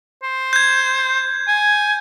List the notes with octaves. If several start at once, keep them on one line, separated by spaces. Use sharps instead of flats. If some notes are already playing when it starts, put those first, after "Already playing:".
C5
G6 G#6
G#5